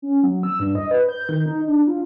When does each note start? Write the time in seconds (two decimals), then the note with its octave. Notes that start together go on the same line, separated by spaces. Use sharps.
0.02 C#4
0.23 F#3
0.43 E6
0.60 G2
0.75 D#5
0.91 B4
1.09 G6
1.29 D#3
1.46 D#4
1.67 D4
1.87 F4